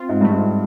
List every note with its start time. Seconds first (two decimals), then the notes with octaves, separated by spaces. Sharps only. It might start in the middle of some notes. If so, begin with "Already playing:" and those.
Already playing: C4 F4
0.09 G#2
0.21 G2 A3
0.33 G#2